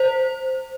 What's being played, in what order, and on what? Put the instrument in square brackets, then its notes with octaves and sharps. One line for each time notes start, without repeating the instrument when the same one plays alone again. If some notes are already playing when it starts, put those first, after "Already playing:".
Already playing: [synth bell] C5